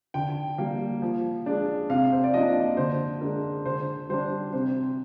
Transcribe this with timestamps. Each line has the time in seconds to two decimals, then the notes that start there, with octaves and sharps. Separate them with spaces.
0.14 D3 G5
0.58 G3 A#3
1.02 F3
1.46 G#3 D4
1.89 C3 F5
2.12 C5
2.24 D5
2.33 F3 A#3 D4 D#5
2.77 D3 C5
3.21 G#3 D4 A#4
3.66 D3 C5
4.09 G3 D4 C5
4.53 C3 C5